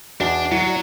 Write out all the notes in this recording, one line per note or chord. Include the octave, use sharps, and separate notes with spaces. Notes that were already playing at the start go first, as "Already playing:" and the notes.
E2 D4 D#4 F#4 D5
F#3 E4
F#4 D5